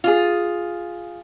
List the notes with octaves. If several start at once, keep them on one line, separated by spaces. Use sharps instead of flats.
F4 G#4